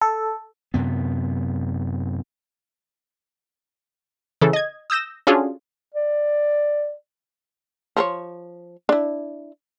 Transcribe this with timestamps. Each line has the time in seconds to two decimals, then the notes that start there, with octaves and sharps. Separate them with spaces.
0.01 A4
0.74 F#2 C3 B3
4.41 C#3 E3 A4
4.53 D#5 G#6
4.90 D#6 E6 G6 A#6 E7
5.27 C#4 D4 F4 F#4 G#4 A4
5.94 D5
7.96 F3 A#4 C#5
8.89 D4 E4